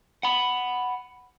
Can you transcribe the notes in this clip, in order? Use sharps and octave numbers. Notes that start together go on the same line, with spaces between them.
F#5 B5